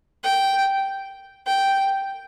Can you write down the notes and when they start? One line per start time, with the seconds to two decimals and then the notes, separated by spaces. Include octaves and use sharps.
0.23 G5
1.47 G5